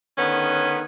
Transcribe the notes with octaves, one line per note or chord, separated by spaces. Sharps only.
D3 D#3 B3 C#4